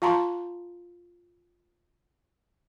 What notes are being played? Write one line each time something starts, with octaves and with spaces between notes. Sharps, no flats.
F4 F5 A5 A#5 C6